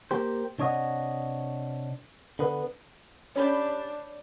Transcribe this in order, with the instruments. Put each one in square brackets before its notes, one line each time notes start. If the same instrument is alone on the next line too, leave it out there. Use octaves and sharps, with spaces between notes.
[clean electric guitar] A#3 G4 C5
C3 D4 C#5 D#5 F#5
D3 B3 B4
[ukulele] C#4 G4 [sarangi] D4 [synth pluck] C#5 B5 G6